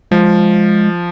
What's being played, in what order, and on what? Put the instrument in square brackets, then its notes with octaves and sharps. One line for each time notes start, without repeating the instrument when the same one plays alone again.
[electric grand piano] F3 [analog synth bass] G#3